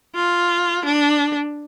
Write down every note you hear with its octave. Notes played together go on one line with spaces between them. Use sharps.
F4
D4